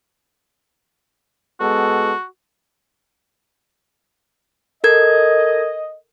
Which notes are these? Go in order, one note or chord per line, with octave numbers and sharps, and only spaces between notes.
G#3 B3 F#4 A4
A4 A#4 D#5 G#6